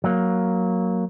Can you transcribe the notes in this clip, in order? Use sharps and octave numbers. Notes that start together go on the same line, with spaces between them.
F#3 A#3